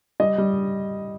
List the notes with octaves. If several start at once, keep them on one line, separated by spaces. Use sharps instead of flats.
G3 D#5
G3